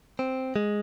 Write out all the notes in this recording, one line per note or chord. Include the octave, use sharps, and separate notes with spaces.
C4
G#3